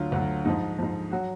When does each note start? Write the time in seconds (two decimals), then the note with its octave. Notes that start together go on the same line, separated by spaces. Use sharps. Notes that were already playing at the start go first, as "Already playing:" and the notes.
Already playing: D2 D3 F#3 F4
0.12 D2 D3 F#3 F#4
0.45 G#2 F3 D#4
0.78 G#2 F3
1.11 F#3 F#4